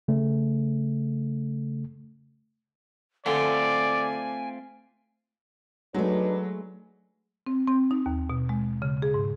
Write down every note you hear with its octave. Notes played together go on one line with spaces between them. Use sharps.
C#3 A3
D3 A3 C4 F4 D5 G#5
F#3 G#3 A3 D4 D#4 B4
C4
C4
D#4
D#2
B2
G#3
C#3
G#4
G#2